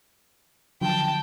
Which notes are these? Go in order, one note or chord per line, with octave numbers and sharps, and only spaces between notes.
D3 F3 F#3 G5 A5